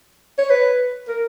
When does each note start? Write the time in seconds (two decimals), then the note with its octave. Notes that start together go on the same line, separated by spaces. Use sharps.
0.38 C#5
0.50 B4
1.08 A#4